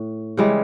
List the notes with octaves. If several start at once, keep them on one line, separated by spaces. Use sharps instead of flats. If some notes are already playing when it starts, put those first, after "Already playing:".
Already playing: A2
C#3 E3 G3 G#3